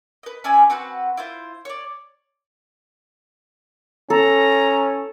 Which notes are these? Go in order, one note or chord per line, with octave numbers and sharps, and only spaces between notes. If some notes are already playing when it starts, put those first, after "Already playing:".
B4 D#5
C#4 D5 E5 G#5
C4 F#4 B4 F#5
E4 F4 C5
C#5 D5
C#4 A4 A#5